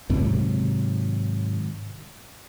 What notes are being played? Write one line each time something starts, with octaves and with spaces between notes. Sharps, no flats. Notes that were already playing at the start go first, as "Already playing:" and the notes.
G#2 C3 D#3 F#3